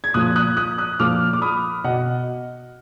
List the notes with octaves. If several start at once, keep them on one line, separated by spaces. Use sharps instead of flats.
G#6
A#2 F3 D#6 F#6
G#6
D#6 F#6
D#6 F#6
D#6 F#6
A#2 F3 D6 F6
D6
B5 D#6
B2 D#5 F#5